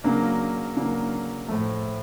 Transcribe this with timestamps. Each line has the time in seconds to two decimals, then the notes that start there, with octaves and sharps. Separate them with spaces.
0.04 C#3 F#3 A#3 D4
0.77 C#3 F#3 A#3 D4
1.48 A2 F3 A3